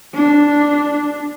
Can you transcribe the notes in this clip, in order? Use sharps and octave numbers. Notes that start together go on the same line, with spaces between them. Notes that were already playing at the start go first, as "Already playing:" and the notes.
D4